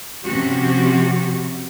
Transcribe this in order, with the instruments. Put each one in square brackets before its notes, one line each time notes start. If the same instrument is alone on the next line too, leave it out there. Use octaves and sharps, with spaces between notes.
[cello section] C3 F3 C#4 F#4 G4